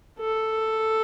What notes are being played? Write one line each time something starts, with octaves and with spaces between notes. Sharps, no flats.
A4